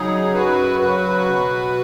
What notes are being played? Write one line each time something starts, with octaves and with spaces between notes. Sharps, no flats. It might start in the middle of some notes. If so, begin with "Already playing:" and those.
Already playing: C#3 F#3 D#4 G#4
F#2 F#4 B4
C#3 F#3 F#4 B4
B2